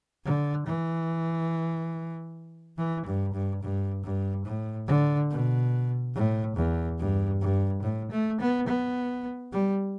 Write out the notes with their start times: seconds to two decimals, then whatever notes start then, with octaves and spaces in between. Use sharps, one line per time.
0.25 D3
0.66 E3
2.78 E3
3.06 G2
3.33 G2
3.62 G2
4.04 G2
4.45 A2
4.87 D3
5.30 B2
6.14 A2
6.56 E2
6.99 G2
7.41 G2
7.83 A2
8.11 A3
8.40 B3
8.67 B3
9.52 G3